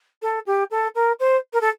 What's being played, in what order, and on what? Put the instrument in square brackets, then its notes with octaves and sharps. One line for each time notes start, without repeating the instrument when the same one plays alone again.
[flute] A4
G4
A4
A#4
C5
A#4
A4